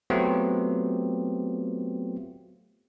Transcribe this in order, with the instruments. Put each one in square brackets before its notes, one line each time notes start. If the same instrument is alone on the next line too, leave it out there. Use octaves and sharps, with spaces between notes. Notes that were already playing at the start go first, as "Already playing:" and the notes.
[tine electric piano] F#3 A3 B3 C4 F4 G4